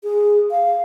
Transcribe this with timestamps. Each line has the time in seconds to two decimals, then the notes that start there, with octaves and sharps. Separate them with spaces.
0.04 G#4
0.51 F5